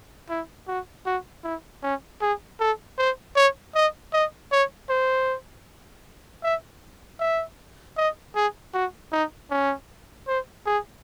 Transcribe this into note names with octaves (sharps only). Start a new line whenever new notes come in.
E4
F#4
F#4
E4
C#4
G#4
A4
C5
C#5
D#5
D#5
C#5
C5
E5
E5
D#5
G#4
F#4
D#4
C#4
C5
G#4